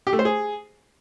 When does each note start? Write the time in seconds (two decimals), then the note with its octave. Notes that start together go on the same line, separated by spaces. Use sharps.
0.07 G4
0.13 A3
0.19 C5
0.25 G#4